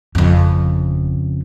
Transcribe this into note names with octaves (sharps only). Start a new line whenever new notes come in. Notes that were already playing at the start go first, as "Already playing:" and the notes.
G1 F2 C#3